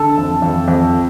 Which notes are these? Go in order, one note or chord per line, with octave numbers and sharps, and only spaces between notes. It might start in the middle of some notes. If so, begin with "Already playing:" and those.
Already playing: D3 A4
F2
F2
F2